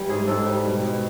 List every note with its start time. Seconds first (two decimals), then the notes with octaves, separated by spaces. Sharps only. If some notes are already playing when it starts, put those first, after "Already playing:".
Already playing: E3 G3
0.09 G#2 G#4
0.27 G#2 A4
0.46 G3
0.64 B2
0.83 B2